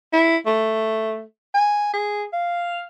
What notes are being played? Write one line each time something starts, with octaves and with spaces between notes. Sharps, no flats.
E4
A3
G#5
G#4
F5